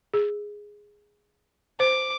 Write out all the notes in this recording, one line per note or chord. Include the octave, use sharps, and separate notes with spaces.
G#4
C5 D6